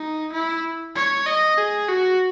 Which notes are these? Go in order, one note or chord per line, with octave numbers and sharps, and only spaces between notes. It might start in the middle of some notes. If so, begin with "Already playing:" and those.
Already playing: D#4
E4
C#5
D#5
G#4
F#4